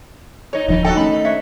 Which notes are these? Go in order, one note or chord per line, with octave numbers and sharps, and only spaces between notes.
A#2 D#4 C#5
D1 D#3 F3 D4 D#4
D#2 D#4 F#4 A4 D#5 G5
A3 C#4 B5
D4 C#5 E5